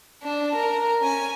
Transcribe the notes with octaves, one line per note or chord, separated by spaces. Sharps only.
D4
A#4
C#4 G#5